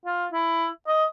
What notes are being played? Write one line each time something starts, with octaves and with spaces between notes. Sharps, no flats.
F4
E4
D#5